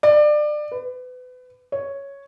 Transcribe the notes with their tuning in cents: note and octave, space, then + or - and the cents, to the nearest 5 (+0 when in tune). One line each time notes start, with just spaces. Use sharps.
D5 +25
B4 +30
C#5 +0